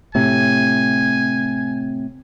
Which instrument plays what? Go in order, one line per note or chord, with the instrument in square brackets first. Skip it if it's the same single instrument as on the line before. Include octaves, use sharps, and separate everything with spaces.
[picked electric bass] A2 C3 [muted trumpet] G#5